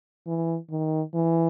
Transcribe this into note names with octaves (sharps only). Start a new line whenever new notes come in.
E3
D#3
E3